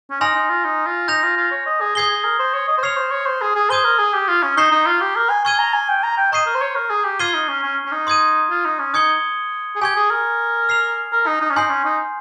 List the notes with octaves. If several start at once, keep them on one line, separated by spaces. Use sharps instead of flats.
C#4
D#4 G#5 C6 F6 A#6 F7
D#4
F4
D#4
F4
D#4 G6 A#6 F7
F4
F4
C#5
D#5
G#4
G#4 D#6 G#6 C7 G7
G#4
A#4
C5
C#5
D#5
C5
C#5 F6 C7 F7
C5
C#5
C5
G#4
G#4
C5 D#6 G#6 D#7 G7
A#4
G#4
G4
F4
C#4
D#4 A#5 C#6 G6 C7 G7
D#4
F4
G4
A#4
G#5
G#5 C#6 F6 G#6 D#7 G7
A#5
G#5
G5
A#5
G5
D#5 A#5 C#6 G6 C7 D#7
A#4
C5
C#5
A#4
G#4
G4
F4 F6 G#6 C7 D#7 G7
D#4
C#4
C#4
C#4
D#4
C6 D#6 G#6 D#7
F4
D#4
C#4
D#4 D#6 G#6 C#7 G7
G#4
G4 G#5 C#6 G#6
G#4
A#4
F6 C7 F7
A#4
D#4
D#4
C#4
D#4 G#5 C6 G6 C7
C#4
D#4